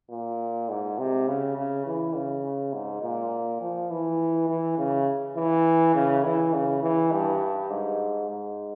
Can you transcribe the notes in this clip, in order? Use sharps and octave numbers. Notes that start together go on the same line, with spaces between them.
A#2
G#2
C3
C#3
C#3
E3
C#3
G#2
A#2
F3
E3
E3
C#3
E3
C#3
E3
C#3
E3
G2
G#2
G#2